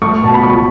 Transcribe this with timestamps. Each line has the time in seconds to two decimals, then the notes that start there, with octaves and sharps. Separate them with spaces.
0.02 A3 C#6
0.22 B2 A5
0.34 B5
0.43 C#2 C#6